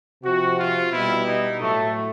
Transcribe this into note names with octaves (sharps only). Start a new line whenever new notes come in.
C3 F3 F#4
F4
B2 G3 E4
D#4
A2 F#3 A3